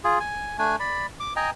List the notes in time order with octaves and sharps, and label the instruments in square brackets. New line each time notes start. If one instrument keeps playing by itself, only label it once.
[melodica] F4 G#4
G#5
A3 D4 G#5
D5 B5
D6
D#5 G5 G#5 A#5